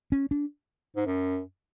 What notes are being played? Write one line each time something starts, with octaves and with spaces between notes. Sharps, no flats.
C#4
D4
G#2
F#2